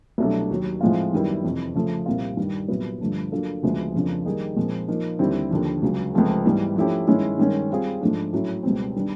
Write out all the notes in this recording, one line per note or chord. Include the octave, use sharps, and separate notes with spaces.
C2 B2 F#3 A3 D4
D#2 D#3 F#3
A2 F3 G#3 C4 F4
F#2 D#3 G3 B3 E4
F2 C3 E3
C#3 F3 A3
C2 A#2 G3 C4 F4
G2 D#3 G3
C2 A#2 F#3 B3
G2 D3 F3 A3 D4
F#3 A#3 D4 F4 A4
D2 C#3 F3 G#3 B3
F2 C#3 F3 A#3 D4
D#3 G3 A#3 D#4 G#4
A#2 F3 G#3 C4
F3 A#3 D#4
D#2 D3 G3 C4 E4
D#2 D3 F3
C#2 C#3 F#3
C#2 C3 F3 A3 C4
G#2 E3 G3 B3
F3 A3 C#4 E4 G4
G2 D#3 G#3 C#4 E4
G2 D#3 G#3 C#4
G3 C4 F4 G#4
G#2 F3 A3 D4
A2 F#3 A3 C#4 E4
C#2 B2 G3 C4
D#3 G3 B3 D4